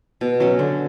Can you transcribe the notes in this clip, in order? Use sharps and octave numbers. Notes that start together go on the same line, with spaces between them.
B2
F#3 C#4
D3